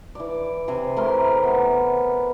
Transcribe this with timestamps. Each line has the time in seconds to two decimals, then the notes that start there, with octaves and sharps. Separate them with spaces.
0.15 E3 D5
0.68 C3 C5 G#5
0.97 A2 E3 A#4 C6
1.43 B3